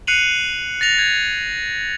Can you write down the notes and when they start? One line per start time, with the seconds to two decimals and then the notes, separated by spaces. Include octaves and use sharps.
0.07 F#6 C7 C#7 D#7 F7 F#7
0.81 A6 A#6 F7
0.99 G#6